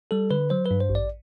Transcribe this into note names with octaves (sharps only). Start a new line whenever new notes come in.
G3 A4
D3 B4
F#3 C5
B4
G2
C5
A1
D5